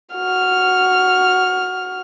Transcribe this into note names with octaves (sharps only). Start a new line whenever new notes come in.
F#4 F6